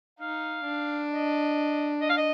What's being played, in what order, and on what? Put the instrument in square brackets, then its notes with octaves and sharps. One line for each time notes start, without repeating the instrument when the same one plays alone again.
[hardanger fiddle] D#4 [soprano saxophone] F5
[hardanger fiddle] D4
[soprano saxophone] D#5
D#5
F5
D#5